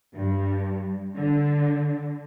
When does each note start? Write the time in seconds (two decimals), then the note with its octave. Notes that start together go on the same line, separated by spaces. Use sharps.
0.15 G2
1.15 D3